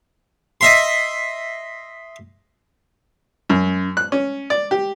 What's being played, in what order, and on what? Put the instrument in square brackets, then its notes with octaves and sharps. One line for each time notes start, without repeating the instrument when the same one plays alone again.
[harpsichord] D#5 E5 C6
[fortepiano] F#2
F#6
C#4
D5
G4